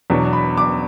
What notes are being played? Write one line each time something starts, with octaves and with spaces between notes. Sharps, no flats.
E2 B2 F#3 B3 D4
B5
D6